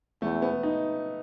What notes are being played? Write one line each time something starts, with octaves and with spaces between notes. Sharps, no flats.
E2 A3
B3
D#4